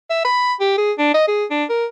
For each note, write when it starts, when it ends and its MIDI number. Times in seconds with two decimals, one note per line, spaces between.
0.10 0.21 76
0.25 0.53 83
0.60 0.73 67
0.78 0.92 68
0.98 1.14 62
1.14 1.23 75
1.28 1.44 68
1.51 1.64 62
1.69 1.85 70